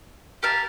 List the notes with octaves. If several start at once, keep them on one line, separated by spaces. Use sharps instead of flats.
G4 A#4 F5 A5